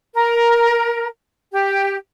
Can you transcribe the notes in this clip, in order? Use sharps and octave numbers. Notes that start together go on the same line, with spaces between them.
A#4
G4